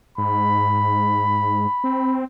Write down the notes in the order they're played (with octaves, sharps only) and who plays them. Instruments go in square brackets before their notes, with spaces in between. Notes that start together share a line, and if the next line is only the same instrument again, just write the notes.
[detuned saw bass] G#2 [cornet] B5
[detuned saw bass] C4